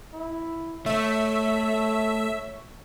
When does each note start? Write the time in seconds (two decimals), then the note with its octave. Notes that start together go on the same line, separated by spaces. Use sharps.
0.14 E4
0.86 A3 C#5 E5